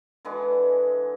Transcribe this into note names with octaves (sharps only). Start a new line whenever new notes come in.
D3 E3 G#3